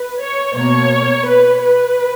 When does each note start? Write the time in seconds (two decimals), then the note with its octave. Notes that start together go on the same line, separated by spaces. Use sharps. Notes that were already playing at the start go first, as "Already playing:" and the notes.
Already playing: B4
0.21 C#5
0.56 B2 A#3 C#5
1.26 B4
1.59 B4